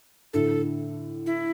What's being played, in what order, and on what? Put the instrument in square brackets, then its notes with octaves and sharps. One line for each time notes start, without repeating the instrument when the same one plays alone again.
[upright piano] A2 D3 [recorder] A4
[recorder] E4